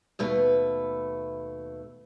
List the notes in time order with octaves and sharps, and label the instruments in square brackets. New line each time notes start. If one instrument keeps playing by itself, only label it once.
[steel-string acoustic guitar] D#2 B2 A3 B4